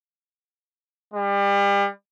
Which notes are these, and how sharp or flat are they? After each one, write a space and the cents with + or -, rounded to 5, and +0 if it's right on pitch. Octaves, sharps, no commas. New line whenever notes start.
G3 +35